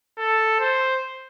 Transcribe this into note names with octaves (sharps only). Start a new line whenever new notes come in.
A4
C5